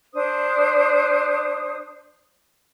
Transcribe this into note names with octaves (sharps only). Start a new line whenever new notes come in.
D4 C5 D#6